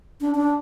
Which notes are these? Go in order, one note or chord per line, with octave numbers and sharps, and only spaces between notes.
D4
D4